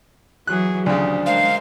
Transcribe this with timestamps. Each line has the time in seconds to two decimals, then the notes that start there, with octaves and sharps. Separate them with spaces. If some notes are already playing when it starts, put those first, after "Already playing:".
0.47 E3 F#3 G#4 F#6
0.86 D2 C#3 F3 D4 G4
1.26 G#3 A#4 C5 F5